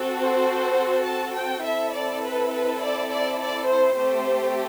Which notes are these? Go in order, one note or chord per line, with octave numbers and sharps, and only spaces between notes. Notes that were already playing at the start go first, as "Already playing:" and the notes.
Already playing: C4 F#4 A4
C5
A5
G5
C4 E4 A4 E5
D5
B4
B4
D5
D5
D5
C5
A3 C4 G4 C5